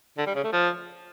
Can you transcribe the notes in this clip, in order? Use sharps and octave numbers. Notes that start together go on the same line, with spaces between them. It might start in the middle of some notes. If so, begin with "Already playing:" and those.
D3
G3
C#3
A3
F3